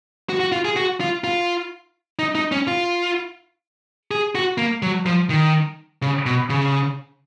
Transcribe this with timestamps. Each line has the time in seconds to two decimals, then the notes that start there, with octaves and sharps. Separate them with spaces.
0.29 F#4
0.40 F#4
0.52 F4
0.65 G#4
0.76 F#4
1.00 F4
1.24 F4
2.19 D#4
2.35 D#4
2.52 C#4
2.67 F4
4.11 G#4
4.35 F#4
4.58 A#3
4.82 F#3
5.06 F3
5.30 D#3
6.02 C#3
6.26 B2
6.50 C#3